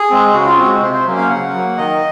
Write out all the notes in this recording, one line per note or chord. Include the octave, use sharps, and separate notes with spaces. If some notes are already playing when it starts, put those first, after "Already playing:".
Already playing: G#4
G#3 C4
C#3 F#4
F4
G#3 C4 F#4
C3 C5
C5
F#3 A#3 C#4
F5
C#3 F#5
F#3 A#3
D#3 D#5